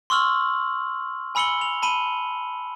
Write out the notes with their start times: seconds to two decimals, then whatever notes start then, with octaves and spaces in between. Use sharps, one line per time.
0.10 C6 C#6 E6 F6 F#7
1.35 G#5 B5 E6 C#7 F#7 G7
1.61 F7
1.82 A5 B5 D#7 F#7 G7